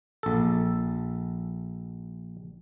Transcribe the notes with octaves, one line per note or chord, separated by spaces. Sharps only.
A#1 A4